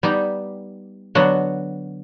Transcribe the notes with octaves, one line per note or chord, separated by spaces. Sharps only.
G3 B3 D#4 G4
D3 F#3 B3 D4 F#4